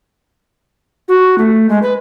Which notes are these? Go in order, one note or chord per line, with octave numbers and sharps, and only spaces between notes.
F#4
A3
G#3
B4